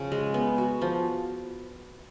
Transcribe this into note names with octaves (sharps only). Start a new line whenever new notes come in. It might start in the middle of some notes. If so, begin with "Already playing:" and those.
Already playing: C#3 F3
G#3
B3
F#4
F3